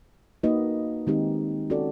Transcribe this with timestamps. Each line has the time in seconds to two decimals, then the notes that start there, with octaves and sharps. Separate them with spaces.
0.43 A#3 D#4 F#4 B4 D#5
1.07 D#3 G#3 C4 D#4 G4
1.70 C#4 F#4 A4 D5